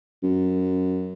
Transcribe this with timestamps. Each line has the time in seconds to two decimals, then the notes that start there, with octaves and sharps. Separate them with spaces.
0.23 F#2